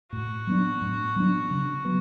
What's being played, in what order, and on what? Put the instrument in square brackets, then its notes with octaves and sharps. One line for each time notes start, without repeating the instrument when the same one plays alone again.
[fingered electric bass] A2 [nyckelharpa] F#4
[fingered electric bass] F#3 B3 D4
A2
F#3 B3 D4
C#3
F#3 B3